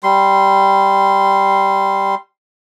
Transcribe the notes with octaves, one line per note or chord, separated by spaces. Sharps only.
G3 C6